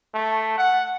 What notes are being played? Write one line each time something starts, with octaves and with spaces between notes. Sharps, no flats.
A3
F#5